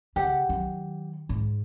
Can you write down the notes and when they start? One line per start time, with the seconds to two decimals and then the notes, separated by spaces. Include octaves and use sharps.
0.16 C#3 G4 F#5
0.49 D#3 F#3
1.29 G#2